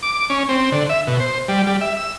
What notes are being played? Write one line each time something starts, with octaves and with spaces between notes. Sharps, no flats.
D6
C#4
C4
D3
E5
B2
C5
G3
G3
E5
E6